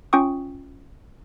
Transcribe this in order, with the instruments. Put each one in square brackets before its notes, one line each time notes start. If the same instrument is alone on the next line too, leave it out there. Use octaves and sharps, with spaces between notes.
[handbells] C#4 F4 G5 C#6 D#6